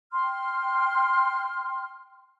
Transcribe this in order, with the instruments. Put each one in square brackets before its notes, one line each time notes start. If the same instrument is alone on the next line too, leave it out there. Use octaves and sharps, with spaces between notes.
[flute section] G5 C6 F6